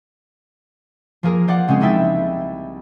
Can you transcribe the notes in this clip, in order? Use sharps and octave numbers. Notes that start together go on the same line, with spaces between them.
F3 A#3 G#4 A#4
C5 D5 F5 F#5
C#3 G#3 C4 C#4 G#4
C2 D#4 E4 E5 G5 A6